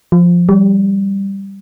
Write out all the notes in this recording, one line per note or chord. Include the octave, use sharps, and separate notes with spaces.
F3
G3